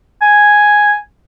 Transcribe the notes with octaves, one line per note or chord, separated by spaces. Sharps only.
G#5